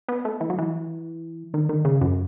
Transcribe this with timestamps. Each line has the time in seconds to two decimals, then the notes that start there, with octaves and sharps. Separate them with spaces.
0.08 B3
0.25 A3
0.40 E3
0.50 F#3
0.58 E3
1.54 D#3
1.69 D#3
1.85 C#3
2.01 F#2